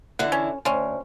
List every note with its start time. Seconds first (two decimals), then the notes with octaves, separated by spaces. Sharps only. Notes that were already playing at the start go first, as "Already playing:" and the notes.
0.19 D3 E3 E4 F#5
0.32 C#4
0.65 D2 C4 C#4